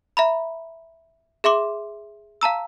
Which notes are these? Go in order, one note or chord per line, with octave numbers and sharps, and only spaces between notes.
E5 A#5 B5
G#4 E5 C6 D6
F5 A5 A#5 E6